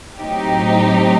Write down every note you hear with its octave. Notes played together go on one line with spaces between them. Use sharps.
A2 F#3 C4 D#4 G4